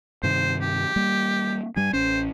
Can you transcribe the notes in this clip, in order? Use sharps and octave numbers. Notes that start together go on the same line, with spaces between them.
G2 C3 D#3 C5
G4
G3 A#3
G2 G3 G#5
A1 C#4 C5